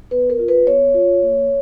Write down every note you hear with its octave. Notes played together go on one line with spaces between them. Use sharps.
B3 B4
A#4
F4
B4
B3 C#5
F4
A#3